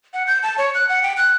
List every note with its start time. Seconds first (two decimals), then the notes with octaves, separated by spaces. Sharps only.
0.14 F#5
0.27 G6
0.43 A5
0.58 C#5
0.75 F#6
0.89 F#5
1.03 G5
1.17 F#6